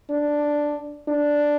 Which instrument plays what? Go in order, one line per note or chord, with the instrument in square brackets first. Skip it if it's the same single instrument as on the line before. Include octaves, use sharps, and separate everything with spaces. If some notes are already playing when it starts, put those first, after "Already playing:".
[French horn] D4
D4